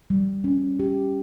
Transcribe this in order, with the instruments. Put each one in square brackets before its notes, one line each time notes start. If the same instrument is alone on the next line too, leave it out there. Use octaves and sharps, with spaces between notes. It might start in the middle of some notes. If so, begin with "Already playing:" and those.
[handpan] G3
C#4
G4